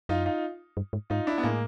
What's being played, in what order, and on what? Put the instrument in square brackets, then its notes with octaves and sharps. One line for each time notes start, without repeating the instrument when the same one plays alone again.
[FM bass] F#2 [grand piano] D#4 F4
[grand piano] D#4 F4
[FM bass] G2
G#2
[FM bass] G#2 [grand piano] D#4 F4
[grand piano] D4 E4
B3
[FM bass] A2 [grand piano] G#3 A#3